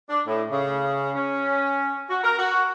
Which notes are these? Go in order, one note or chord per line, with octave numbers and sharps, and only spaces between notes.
D4
A2
C#3
C#4
F#4
A#4
F#4